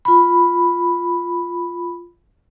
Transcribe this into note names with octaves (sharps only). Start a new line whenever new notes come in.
F4 B5